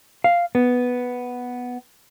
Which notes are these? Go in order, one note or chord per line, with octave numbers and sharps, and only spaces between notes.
F5
B3